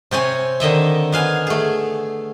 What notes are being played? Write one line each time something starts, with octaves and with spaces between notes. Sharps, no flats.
C3 C4 C#5 G#5
D3 D#3 D#5 E5
B3 F5 G#5
A3 G#4